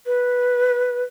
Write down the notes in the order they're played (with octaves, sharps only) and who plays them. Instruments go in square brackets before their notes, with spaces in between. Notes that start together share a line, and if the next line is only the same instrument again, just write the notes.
[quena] B4